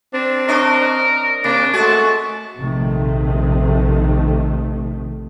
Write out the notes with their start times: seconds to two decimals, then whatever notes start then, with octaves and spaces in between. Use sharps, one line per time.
0.14 C4 D4
0.48 D4 A#4 C#5 D#5
1.44 C3 A#3 D4
1.73 G#3 A3 F#4 A5
2.60 A#1 C3 D#3 A3